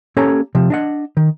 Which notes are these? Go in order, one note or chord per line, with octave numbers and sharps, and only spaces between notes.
A#3 C#4 G4 A4 C#5 A#5
C3 F3
D4 D#5 F#5
D#3